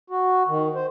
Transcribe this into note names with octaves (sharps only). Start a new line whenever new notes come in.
F#4
D#3
C5